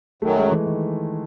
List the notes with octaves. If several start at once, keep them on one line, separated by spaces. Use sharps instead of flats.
F#2 D#3 F#3 A3
G#3
E3
D#3